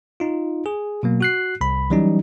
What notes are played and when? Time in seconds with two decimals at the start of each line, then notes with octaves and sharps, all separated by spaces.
0.20 D#4 F4
0.66 G#4
1.03 B2 F#3 A#3
1.21 F#4 F#6 C7
1.61 C2 B5
1.90 E3 F#3 G3 C#4 D#4